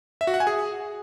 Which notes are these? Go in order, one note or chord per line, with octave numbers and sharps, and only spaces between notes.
E5
F#4
F#5
G#5
G#4